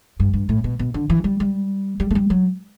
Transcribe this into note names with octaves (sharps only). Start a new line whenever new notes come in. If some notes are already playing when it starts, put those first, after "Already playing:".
G2
G2
A2
B2
B2
D3
E3
G3
G3
G3
A3
G3
F#3